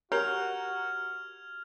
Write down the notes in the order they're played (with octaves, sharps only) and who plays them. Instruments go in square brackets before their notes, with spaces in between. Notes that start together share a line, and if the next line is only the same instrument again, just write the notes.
[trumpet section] F#4 [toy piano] G4 C#5 G#5 [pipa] A#4 [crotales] F6 G#6 F7